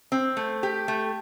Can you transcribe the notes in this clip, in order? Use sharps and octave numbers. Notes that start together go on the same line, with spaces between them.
C4
A3
G4
A3